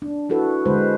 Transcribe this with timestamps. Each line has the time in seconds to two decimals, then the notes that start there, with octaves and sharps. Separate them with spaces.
0.02 D4
0.29 D4 E4 F#4 A4 B4
0.66 D3 G#3 B4 C5